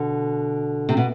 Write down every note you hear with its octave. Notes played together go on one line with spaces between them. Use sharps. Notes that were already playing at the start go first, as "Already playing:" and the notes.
Already playing: B2 D3
C3
B2